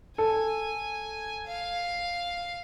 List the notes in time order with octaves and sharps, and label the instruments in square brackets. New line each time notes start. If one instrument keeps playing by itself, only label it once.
[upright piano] A4 [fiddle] G#5
[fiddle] F5